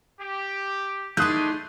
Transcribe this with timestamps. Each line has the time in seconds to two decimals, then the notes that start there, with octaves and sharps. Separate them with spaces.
0.20 G4
1.17 A3 D4 D#4 G#5 C6 D#6 F#6 G6